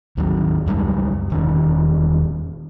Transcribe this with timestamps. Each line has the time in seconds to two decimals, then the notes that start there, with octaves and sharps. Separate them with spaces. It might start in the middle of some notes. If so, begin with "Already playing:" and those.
0.17 D#2 D#3 F#3
0.67 C#2 F#2 G3 G#3
1.30 E1 D#3 C#4